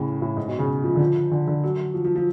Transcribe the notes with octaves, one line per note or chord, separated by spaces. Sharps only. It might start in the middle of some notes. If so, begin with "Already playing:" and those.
Already playing: A2 C#3
A2
G#2
B2
C#3
F3
D3
F3
D3
D3
F#3
F3
F3
F3